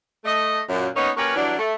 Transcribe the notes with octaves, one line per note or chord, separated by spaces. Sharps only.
A3 D#5
F#2 A#2
A#3 B3 C#4 D#4
A#3 C#4 F#4 G4 A#4 B4
E3 F#3 G3 D4
A3